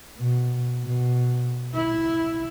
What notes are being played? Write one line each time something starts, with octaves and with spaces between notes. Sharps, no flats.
B2
B2
E4